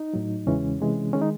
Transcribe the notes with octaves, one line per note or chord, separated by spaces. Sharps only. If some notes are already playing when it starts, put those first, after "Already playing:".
Already playing: D#4
A2 F#3
E2 C#3 E3 G#3 C#4
C3 E3 G#3
D#3 G#3 C#4
D#4